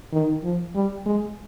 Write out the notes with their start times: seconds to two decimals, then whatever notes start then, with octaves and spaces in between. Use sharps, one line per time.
0.13 D#3
0.44 F3
0.75 G3
1.06 G#3